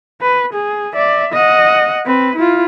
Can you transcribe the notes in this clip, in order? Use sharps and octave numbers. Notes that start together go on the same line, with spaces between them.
B4
G#4
D5 E5
D#5 F#5
C4 B4
E4 F4